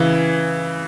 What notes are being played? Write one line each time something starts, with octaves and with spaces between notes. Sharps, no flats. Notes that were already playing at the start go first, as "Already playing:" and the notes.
Already playing: C#3 E3